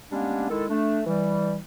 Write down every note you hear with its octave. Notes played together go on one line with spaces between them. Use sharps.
G3 G#3 A#3 B3 C#4 D4
D#3 G#3 E4 A4
A3 D4
E3 G3